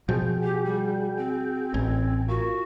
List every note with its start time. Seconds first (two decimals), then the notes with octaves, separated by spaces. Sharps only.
0.09 B2 F3 F#4 G#4 G5
0.43 G4
0.65 G3
1.17 C4
1.74 A1 G#5
2.28 F4 F#4 A#4